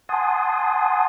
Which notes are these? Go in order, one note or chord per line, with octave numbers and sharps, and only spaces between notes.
F#5 G#5 A5 C6 D#6